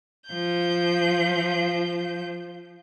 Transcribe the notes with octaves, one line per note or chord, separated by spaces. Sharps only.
F3 G6